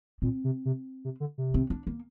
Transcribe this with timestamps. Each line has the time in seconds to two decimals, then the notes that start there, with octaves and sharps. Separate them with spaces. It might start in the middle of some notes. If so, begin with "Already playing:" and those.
0.22 A#2 C4
0.44 C3
0.65 C3
1.04 C3
1.20 D3
1.38 C3
1.54 C4
1.70 D4
1.87 A#3